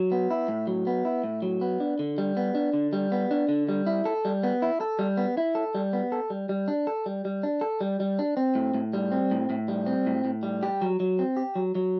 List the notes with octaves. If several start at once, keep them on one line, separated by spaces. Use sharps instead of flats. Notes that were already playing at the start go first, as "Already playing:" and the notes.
Already playing: F#3
B3
E4
A2
F#3
B3
E4
A2
F#3
B3
D4
D3
G3
B3
D4
D3
G3
B3
D4
D3
G3
E4
A4
G3
B3
E4
A4
G3
B3
E4
A4
G3
B3
A4
G3
G3
D4
A4
G3
G3
D4
A4
G3
G3
D4
C4
A2
A2
G3
C4
A2
A2
G3
C4
A2
A2
G3
G4
F#3
F#3
C4
G4
F#3
F#3